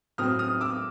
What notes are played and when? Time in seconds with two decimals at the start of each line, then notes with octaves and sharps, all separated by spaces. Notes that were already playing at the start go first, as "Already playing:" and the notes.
0.18 A2 F#3 A3 C4 D#6 F6
0.39 D#6 F6
0.61 D6 E6